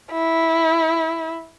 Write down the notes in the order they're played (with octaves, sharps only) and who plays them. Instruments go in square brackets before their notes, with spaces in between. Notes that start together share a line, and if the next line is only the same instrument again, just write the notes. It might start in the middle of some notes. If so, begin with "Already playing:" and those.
[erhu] E4